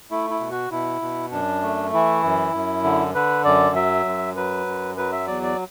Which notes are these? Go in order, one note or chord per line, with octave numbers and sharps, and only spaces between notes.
A3 E4
E4
B2
F#4
B2 E4
B2
F#2 D4
A3
E3 E4
F#2
F#2
D3
D3 B4
F#2 D5
F#3 E5
F#2
F#3 B4
F#2
F#3 B4
E5
E2 D5
D5